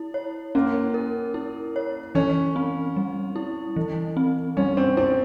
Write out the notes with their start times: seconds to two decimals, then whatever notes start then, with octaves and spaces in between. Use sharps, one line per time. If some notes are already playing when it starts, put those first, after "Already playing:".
Already playing: E4
0.14 C#5
0.55 A#3 C#4
0.94 A#4
1.34 E4
1.76 C#5
2.15 E3 C#4
2.56 C4
2.96 G3
3.36 E4
3.76 E3
4.17 C4
4.57 G3 C#4
4.77 C4
4.97 C4 E4